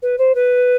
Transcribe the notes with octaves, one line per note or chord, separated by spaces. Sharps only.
B4
C5
B4